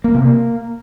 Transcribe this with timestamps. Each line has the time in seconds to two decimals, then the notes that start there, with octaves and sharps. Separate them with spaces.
0.04 A#3
0.15 C3
0.25 A#3